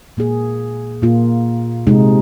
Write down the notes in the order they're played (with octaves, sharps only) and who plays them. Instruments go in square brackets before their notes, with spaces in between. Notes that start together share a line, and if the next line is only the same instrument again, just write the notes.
[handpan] A#2 A#3 G#4
A#2 A#3 F4
C3 G#3 D#4